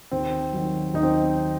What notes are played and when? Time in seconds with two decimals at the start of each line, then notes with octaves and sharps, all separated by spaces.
0.11 D#2 C4
0.52 D#3 F#3
0.94 D#2 D#4
1.03 C4